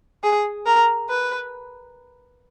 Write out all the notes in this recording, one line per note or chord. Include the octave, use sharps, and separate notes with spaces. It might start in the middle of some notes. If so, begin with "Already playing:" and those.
G#4
A#4
B4